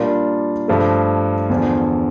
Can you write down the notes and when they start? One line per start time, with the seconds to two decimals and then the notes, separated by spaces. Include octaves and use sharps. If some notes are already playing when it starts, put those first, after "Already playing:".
Already playing: A#2 G3 D4 F4 A#4
0.68 G2 F3 A3
1.50 E2 D3 F3